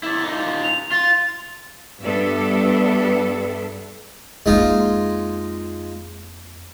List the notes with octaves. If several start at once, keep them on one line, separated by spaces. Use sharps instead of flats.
E4 D5
D#4 F4
F7
F4 A6
G2 G3 B3 D4 A4 E5
F2 G#3 A#3 D#4 F4